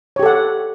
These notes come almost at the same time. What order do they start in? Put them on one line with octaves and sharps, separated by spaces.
C#5 G4 A4 F#5